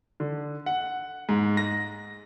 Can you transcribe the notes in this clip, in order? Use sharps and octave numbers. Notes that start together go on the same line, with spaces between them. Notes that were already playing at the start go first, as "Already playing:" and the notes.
D3
F#5
G#2
A#6